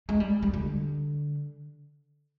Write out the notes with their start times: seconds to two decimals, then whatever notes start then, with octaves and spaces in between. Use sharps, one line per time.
0.09 G#3
0.20 G3
0.43 G3
0.54 D3